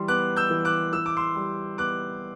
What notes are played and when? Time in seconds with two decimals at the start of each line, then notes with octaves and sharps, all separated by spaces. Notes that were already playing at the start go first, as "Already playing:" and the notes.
Already playing: E3 G3 C6
0.08 B3 D6 F#6
0.36 E6 G6
0.50 E3
0.65 D6 F#6
0.93 E3 E6
1.06 D6
1.17 C6 E6
1.35 G3
1.78 B3 D6 F#6